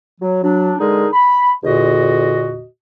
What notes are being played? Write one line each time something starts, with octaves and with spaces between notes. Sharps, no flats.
F#3
F#3 D4
D3 G#3 D#4 G#4 A#4
B5
E2 A#2 D3 F#4 D#5